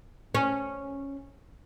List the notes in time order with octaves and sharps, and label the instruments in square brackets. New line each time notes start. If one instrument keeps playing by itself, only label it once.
[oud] C#4